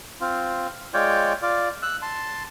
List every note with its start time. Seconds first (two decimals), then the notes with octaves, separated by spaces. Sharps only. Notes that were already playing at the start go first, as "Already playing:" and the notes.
0.21 C4 F4
0.94 G#3 F4 C#5 D5 G5
1.42 F4 D5
1.82 E6 F#6
2.02 A5 C6